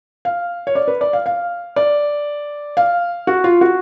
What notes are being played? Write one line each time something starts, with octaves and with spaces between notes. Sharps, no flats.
F5
C#5
D5
B4
D5
F5
F5
D5
F5
F#4
F4
F#4